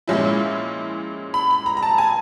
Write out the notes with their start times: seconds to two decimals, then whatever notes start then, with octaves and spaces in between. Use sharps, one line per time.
0.07 A#2 F3 G#3 C#4 E4
1.34 B5
1.51 B5
1.66 A#5
1.77 A#5
1.83 A5
1.98 G#5